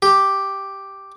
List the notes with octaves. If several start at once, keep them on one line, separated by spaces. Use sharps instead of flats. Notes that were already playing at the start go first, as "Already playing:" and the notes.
G4